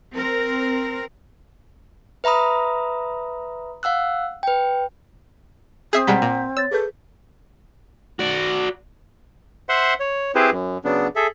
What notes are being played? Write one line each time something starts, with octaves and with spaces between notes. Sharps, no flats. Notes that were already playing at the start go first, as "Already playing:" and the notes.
C4 A#4
B4 E5 A#5 B5 D#6
F5 F#5 E6 F#6
B4 G5
C4 G#4 E5 D#6 G6 C7
B2 G3 G#3 F#5 A#5 B6
A#2
C#5 E6 A6
G#4 A4 B4 G6
F#4 D5
C5 E5 F#5 C6
C#5
C4 E4 G4 G#4 B4 C5
F#2
C#3 F#3 B3 D4
G#4 A4 E5